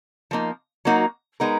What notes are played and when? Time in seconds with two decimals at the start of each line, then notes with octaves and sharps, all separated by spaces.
0.31 F3 A#3 D#4
0.85 F#3 A#3 D#4 F#4
1.40 G#3 B3 D#4 A#4